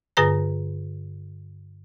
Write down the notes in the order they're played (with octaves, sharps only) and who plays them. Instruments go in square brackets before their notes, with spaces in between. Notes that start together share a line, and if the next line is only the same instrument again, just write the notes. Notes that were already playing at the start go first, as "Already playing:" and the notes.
[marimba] G2 D3 G#4 B4 A#5 A#6